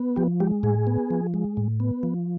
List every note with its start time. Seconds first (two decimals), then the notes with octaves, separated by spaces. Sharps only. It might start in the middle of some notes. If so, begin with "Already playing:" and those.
Already playing: B3
0.16 F3 G4
0.40 G#3 G4
0.63 A2 G#4
0.87 B3
1.10 F3
1.34 G#3
1.57 A2
1.80 B3
2.03 F3